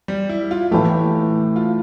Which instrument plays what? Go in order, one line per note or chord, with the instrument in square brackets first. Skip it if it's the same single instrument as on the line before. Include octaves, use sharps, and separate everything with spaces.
[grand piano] G3
E4
F4
[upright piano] A2 E3 A3 [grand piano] G4
[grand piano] F4